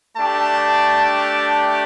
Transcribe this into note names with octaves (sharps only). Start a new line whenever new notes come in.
A3 D4 G4 A5